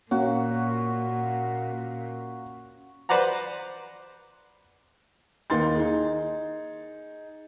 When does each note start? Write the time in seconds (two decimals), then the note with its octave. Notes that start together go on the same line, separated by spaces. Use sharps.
0.11 A#2 A#3 C#4 F#4
3.09 B4 C5 D5 F#5 A#5
5.50 D#2 A#3 D#4 C6 A6
5.75 D#4 G#4